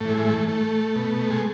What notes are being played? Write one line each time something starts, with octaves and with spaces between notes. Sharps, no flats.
A2 E3 A3
G#3
A3
A3
B2
G#3